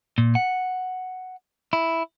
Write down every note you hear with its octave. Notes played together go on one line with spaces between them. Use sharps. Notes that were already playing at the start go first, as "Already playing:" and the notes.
A#2
F#5
E4